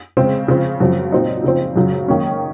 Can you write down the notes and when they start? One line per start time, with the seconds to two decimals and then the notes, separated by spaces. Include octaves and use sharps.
0.17 C#3 G#3 C4
0.48 C#3 F3 C4
0.80 F#2 C#3 F3 C4
1.12 A#2 F#3 C4 D#4
1.44 C#3 F3 C4
1.76 F#2 C#3 F#3
2.08 D#3 A#3 C#4